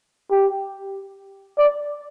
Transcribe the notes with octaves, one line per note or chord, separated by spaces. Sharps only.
G4
D5